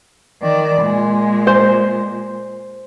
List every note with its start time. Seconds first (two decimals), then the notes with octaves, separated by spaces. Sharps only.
0.42 D#3 D5
0.82 A#2 G#3
1.47 C5